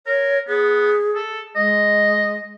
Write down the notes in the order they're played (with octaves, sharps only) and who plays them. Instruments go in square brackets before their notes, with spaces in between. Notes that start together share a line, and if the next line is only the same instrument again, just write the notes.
[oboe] A#4 [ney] C#5
[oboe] B3 [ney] G#4
[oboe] A4
[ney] G#3 [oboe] D#5